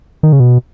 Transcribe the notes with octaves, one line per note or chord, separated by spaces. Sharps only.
D#3
C#3
B2